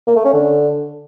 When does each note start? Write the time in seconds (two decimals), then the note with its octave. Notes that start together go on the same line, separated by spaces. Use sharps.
0.07 A#3
0.16 A3
0.25 C#4
0.34 D3